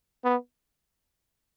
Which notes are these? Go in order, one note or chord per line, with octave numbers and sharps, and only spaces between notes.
B3